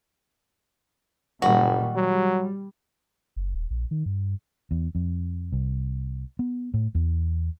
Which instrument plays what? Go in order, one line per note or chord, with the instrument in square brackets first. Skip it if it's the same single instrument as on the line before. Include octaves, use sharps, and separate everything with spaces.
[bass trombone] F#1 [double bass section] A#2 D#3 G3 [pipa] F#4
[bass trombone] F#3 [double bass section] G3
[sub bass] F#1
D#1
A#1
D#3
G2
[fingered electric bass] E2
F2
C2
B3
A2
E2